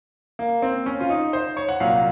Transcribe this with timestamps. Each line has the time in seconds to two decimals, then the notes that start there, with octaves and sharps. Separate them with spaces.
0.39 A#3
0.62 C4
0.86 C#4
1.00 F4
1.10 D#4
1.33 C5
1.57 C#5
1.69 F#5
1.80 C2 A#2 F#3 F5